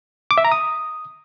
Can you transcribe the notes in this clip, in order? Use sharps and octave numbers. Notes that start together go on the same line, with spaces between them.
D6
E5
A#5
D#6